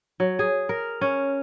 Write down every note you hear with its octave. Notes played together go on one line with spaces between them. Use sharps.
F#3
G#4
A#4
C#4